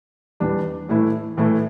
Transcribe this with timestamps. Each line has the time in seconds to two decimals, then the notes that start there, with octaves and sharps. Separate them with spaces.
0.40 E2 E3 G3 D4
0.89 A2 E3 A3 E4
1.37 A2 E3 A3 E4